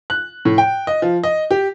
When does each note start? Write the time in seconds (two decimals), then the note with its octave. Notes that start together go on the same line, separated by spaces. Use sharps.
0.10 F#6
0.45 A2
0.58 G5
0.87 D#5
1.02 F3
1.24 D#5
1.51 G4